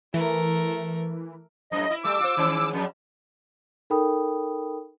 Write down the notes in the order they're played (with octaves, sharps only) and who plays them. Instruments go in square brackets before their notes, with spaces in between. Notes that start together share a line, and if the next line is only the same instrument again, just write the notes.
[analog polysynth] E3 [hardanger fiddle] A3 A#4
[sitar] F#2 A2 [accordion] D#5
[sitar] E4
[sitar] G3 A3 [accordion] D6 E6
[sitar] F4 C5
G#2 D#3 C#4
F2 F#3
[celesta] D#4 A4 A#4 G5 B5 D#6